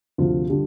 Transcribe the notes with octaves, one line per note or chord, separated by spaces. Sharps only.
D2 C3 F3 F4
D3 G3